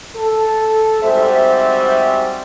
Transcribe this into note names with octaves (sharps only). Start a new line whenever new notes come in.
A4
G#2 G3 C4 F#4 C5 E5